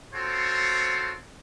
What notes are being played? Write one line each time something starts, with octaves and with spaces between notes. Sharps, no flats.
C4 F4 F#4 A4 C5 C#5